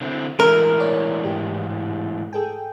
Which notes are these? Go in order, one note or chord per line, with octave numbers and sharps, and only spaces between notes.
D3 C4 E4
A2 E3 G#3 A#4 E5
C#5 D5
G#2 G4
G#4 A4 G5